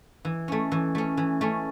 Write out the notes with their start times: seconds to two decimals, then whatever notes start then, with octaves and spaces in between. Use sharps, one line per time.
0.25 E3
0.48 A3 C#4
0.72 E3
0.95 A3 C#4
1.17 E3
1.41 A3 C#4